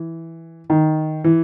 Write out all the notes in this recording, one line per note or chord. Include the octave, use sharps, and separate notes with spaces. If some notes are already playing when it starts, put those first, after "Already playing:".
Already playing: E3
D#3
E3